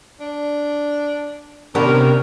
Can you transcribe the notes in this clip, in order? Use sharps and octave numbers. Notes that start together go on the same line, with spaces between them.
D4
C3 D#3 B3 C#4 D4 A#4